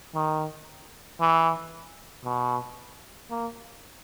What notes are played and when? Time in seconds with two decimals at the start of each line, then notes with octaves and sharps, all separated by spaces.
0.15 D#3
1.21 E3
2.25 B2
3.31 A#3